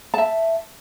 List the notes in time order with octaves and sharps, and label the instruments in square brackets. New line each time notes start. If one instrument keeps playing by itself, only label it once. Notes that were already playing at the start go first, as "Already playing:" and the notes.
[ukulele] E5 A5